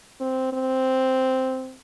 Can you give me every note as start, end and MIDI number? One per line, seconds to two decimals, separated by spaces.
0.21 0.51 60
0.53 1.76 60